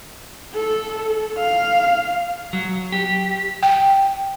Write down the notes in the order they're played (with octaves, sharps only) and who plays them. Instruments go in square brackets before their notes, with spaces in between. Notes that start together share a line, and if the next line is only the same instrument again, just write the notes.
[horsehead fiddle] A4
F5
[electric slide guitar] F#3
G4
[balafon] G5